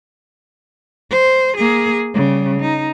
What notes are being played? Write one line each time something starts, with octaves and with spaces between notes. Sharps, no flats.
C5
A#3 G#4
C#3 G3
D#4